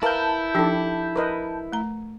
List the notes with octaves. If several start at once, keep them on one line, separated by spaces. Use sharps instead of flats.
E4 A#4 B4 F5 A5 G6
F3 D4 D#4 G4 A4
A#4 B4 D#5
A3 A#5